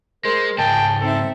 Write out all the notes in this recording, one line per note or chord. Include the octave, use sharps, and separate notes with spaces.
G#3 A#4 C5
C#2 G#2 G#4 G5 A5
C4 D#4 A4 E5